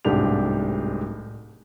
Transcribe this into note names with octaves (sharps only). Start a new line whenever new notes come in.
D1 C2 G#2 D4 G4 F7